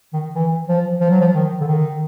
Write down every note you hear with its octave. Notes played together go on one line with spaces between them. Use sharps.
D#3
E3
F3
F3
F#3
F3
D#3
D3
D#3